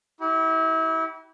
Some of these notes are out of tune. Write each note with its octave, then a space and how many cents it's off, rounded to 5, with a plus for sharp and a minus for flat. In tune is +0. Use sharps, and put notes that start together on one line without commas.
E4 -35 G4 -45